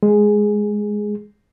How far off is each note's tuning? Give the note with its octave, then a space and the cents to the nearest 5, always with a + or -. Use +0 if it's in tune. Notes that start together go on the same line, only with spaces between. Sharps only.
G#3 +5 G#4 +0